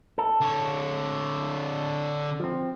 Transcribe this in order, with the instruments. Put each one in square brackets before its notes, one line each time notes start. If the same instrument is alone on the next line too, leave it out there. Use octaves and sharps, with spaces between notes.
[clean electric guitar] A4
[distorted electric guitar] D3 C#5
[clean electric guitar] F3 C4